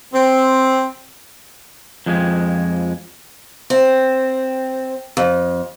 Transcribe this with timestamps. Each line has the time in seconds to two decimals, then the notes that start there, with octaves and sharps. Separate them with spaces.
0.14 C4
2.06 F2 F3 G#3
3.70 C4
5.17 F2